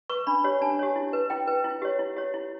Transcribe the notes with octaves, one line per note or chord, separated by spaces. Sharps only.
B4 C#6
D4 B5
G4 C#5
D4 A5
G4 C#5
E4
B4
E4 G5
B4
E4
G4 C#5
E4
G4 C#5
E4